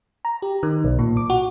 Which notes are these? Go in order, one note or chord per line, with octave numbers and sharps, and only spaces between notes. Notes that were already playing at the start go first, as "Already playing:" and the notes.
A#5
G4
D#3
B1
A#2
D6
F#4